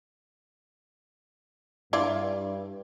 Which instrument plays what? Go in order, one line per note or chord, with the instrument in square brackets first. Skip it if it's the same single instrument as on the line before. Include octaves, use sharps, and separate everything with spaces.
[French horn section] G2 [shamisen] E4 F4 D5